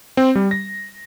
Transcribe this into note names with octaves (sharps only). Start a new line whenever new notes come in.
C4
G3
A#6